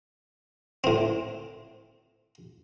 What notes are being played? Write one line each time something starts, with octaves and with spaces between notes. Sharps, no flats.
A2 C4